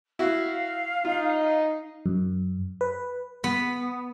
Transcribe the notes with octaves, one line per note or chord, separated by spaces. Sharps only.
E4 F#4 F5
D#4 F4
F#2
B4
B3